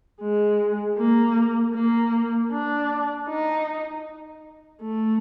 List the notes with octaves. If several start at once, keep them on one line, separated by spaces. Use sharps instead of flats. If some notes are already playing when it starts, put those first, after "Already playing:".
G#3
A#3
A#3
D4
D#4
A3